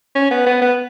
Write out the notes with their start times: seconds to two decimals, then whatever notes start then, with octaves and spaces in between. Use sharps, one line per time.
0.15 C#4
0.31 B3
0.46 B3
0.62 B3